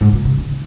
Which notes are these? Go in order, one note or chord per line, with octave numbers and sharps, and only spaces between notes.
G#2
A#2
C3
D3
D#3